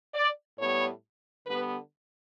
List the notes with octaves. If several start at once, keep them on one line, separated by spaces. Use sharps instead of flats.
D5
A2 G3 B3 C#5
D3 G3 B3 B4